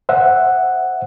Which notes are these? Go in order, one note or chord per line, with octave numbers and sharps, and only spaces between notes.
C5 E5 F#5